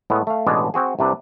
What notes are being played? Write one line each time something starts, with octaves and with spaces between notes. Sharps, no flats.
A2 G#3 B3
A3 F5
A1 B2 G#3 D4
C4 F#4 G#4
C2 C3 D4 B4